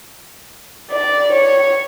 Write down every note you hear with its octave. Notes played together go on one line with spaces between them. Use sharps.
D5
C#5